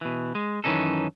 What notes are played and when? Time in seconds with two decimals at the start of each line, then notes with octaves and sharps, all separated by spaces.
0.01 B2 E3
0.35 G#3
0.64 F#2 D#3 E3 C#4 D#4 A4